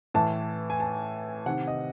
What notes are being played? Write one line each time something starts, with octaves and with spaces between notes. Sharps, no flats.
A2 E3 A5
G#5
A5
C3 D#3 F#5
D#5